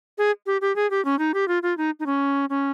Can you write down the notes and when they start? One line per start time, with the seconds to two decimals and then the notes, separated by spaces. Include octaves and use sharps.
0.18 G#4
0.46 G4
0.61 G4
0.76 G#4
0.91 G4
1.05 C#4
1.19 D#4
1.34 G4
1.48 F4
1.63 F4
1.78 D#4
2.00 D#4
2.06 C#4
2.50 C#4